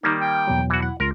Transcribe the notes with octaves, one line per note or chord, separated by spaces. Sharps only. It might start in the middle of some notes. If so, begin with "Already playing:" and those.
D#3 G3 A#3 D#4
G5
E2 B2 F#3
E3 E4 F#4
F#5
C#2 F4 A#4